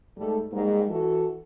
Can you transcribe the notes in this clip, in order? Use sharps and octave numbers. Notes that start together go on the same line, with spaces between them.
G#2 G3 A3 A4
G#2 G3 A#3
E3 F#4 A4